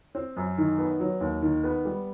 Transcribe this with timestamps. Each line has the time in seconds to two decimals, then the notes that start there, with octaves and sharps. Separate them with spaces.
0.15 C4
0.37 F#2
0.58 D#3
0.78 B3
1.00 F#3
1.21 D#2
1.42 D#3
1.64 B3
1.85 G3